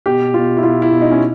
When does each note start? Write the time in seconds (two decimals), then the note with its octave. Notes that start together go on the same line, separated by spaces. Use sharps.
0.06 B2 G4
0.34 B2 F4
0.57 E4
0.63 B2 F4
0.82 E4
0.91 B2
1.01 D#4
1.11 C#4